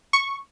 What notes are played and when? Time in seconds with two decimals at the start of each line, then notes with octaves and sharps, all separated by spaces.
0.13 C#6